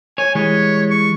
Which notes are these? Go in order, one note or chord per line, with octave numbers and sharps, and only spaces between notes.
C#5 G#5
E3 G3 G#3 C#5
C#6